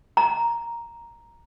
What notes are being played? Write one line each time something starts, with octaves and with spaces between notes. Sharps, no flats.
A#5